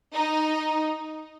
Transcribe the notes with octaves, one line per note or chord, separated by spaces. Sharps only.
D#4